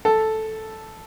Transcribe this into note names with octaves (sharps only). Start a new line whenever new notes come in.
A4